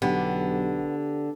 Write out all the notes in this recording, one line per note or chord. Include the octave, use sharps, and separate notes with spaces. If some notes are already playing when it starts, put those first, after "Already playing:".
B1 D3 B3 G4